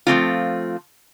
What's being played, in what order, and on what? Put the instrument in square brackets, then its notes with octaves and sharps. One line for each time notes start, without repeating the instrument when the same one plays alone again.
[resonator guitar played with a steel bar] F3 A3 C4 F4